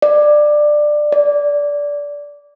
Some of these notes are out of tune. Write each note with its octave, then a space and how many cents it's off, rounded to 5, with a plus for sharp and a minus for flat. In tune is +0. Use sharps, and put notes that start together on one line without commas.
D5 +15
D5 -15